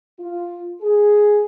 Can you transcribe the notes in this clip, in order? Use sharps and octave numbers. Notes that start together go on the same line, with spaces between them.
F4
G#4